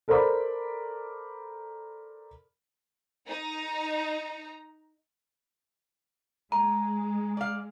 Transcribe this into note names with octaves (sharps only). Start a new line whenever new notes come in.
A4 A#4 C5 D5 B5 D6
D#4 A#5
G#3 A#5
D5 F5